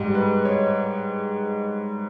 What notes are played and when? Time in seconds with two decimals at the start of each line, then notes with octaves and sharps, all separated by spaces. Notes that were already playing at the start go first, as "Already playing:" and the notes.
Already playing: G#2 G3 D#5
0.15 B4
0.45 C#5